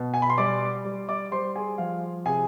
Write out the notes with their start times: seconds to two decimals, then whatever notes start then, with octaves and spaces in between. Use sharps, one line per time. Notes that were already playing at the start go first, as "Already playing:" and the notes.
Already playing: B2
0.14 G#5
0.22 B5
0.30 C6
0.38 G3 D5 D6
0.85 G3
1.09 D5 D6
1.31 G3 C5 C6
1.56 G#4 G#5
1.78 F3 F5
2.26 C3 G#4 G#5